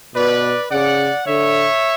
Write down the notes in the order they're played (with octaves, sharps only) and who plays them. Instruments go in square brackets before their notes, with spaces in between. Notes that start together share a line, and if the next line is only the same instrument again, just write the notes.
[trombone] B2 [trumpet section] B4 D5
[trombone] C#3 [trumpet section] D5 F#5
[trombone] D3 [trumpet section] C#5 E5